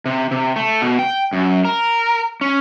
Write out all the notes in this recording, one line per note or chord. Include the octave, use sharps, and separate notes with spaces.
C3
C3
A3
B2
G5
F#2
A#4
C#4